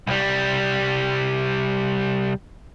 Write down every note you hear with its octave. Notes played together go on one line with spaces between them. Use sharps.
C2 G3